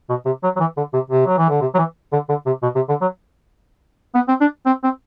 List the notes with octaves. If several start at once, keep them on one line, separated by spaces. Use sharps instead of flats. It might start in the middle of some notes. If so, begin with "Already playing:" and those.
B2
C3
F#3
F#3
E3
D3
C3
C3
F#3
E3
D3
C3
F#3
E3
D3
D3
C3
B2
C3
D3
F#3
B3
C4
D4
C4
C4